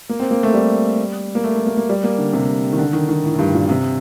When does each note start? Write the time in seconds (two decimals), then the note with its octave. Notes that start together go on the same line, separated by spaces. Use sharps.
0.09 A#3
0.20 C4
0.31 A#3
0.43 A3
0.54 G3
1.35 A#3
1.44 A3
1.55 A3
1.66 A#3
1.77 A#3
1.89 G3
2.04 A#3
2.18 D3
2.33 C3
2.73 D#3
2.78 D3
2.93 D#3
3.09 D#3
3.24 A2
3.34 A2
3.39 G2
3.54 A#2
3.69 C3